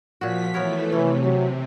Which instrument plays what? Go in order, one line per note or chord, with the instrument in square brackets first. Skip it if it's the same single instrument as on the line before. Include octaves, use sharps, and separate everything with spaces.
[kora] A#2 F#4 [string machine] F3 B6
[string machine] E3 A3 [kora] B3 A#4 C#5
[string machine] C3 [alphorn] E3 [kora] C#4
[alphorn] F#3